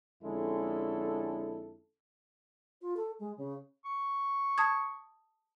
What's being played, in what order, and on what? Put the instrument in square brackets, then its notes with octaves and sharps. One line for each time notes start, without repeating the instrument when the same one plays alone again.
[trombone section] F2 D3 G#3 C#4 E4 A4
[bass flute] F4
A4
G#3
C#3
[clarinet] C#6
[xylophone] A5 D#6 G#6